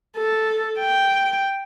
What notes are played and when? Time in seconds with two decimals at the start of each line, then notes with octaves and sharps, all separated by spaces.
0.17 A4
0.79 G5